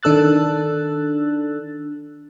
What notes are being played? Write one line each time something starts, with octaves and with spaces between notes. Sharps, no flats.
D#3 D4 A4 E6 F#6 A6